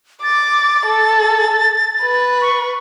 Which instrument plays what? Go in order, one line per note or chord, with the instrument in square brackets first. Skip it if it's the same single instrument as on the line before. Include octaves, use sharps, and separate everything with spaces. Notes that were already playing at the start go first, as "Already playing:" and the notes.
[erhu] D6 [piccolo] A6
[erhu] A4
B4
[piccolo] C#6